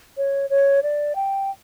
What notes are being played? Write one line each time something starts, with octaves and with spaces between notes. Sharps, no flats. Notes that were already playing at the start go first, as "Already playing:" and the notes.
C#5
C#5
D5
G5